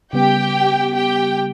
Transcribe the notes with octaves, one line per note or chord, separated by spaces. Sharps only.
C#3 G3 B3 G4 G5
G4 G5